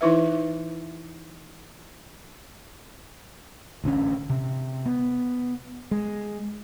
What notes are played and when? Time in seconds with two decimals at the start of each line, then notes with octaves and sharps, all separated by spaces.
0.01 E3 D#4 E4 B4 E5
3.84 A1 D3 D#3 C#4
4.30 C3
4.86 B3
5.91 G#3